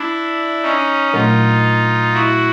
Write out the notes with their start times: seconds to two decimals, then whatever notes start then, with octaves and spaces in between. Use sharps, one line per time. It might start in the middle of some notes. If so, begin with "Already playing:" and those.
Already playing: D4 E4
0.63 C#4 D#4
1.13 A#2 F#3 A3 D4 D#4 F4
2.14 E4 F#4